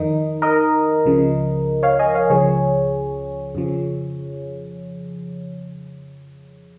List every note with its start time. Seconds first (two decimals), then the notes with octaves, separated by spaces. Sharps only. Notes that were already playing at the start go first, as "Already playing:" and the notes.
Already playing: F2 D#3 D#4
0.42 A#4 D#5
1.05 C#2 C#3 F3
1.83 C#5 F5
1.99 D#5 G#5
2.14 C#5 F5
2.30 C#2 C#3 F3 G#4 C#5
3.55 F2 C#3 F3